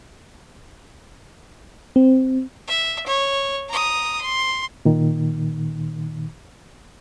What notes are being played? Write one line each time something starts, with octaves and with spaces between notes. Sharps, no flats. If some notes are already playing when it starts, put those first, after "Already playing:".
C4
E5
C#5
A#5 D#6
C6
A#2 D#3